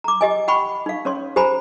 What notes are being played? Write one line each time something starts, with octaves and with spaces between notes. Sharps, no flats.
A#5 D6
G4 D#5 G#5
F#5 G5 B5 C#6
D#4 F5
C#4 C#5 C6
G4 C5 G#5 A#5 B5